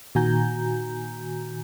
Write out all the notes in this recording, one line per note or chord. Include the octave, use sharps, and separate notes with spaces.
A#2 D#3 F#4 G#5 A#5 G6